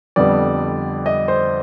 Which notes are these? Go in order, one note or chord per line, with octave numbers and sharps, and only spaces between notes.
F2 D3 G3 B3 D5
D#5
C5